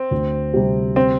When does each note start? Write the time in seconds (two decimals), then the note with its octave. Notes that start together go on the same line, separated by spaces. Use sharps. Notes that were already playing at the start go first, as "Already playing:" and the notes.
Already playing: C4
0.11 D2
0.54 C3 G3 C4 G4
0.96 C4